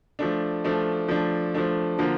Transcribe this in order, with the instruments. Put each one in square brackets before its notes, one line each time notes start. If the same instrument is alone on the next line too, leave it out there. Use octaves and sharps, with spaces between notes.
[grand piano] F3 A3 D4
F3 A3 D4
F3 A3 D4
F3 A3 D4
D3 F3 A#3